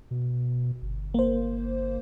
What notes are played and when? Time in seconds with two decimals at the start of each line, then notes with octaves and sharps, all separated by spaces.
0.11 B2
0.82 G1
1.14 A#3 C5